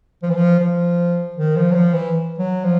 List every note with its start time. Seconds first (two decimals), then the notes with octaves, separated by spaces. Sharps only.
0.22 F3
0.30 E3
0.36 F3
0.60 F3
1.36 D#3
1.56 F3
1.71 F#3
1.75 F3
1.93 E3
2.38 F#3
2.64 F3